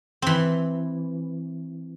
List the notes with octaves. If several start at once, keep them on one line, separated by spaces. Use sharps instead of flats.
E3 C4